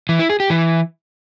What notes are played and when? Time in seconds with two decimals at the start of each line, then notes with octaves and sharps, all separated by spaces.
0.09 E3
0.19 E4
0.30 G#4
0.40 G4
0.50 E3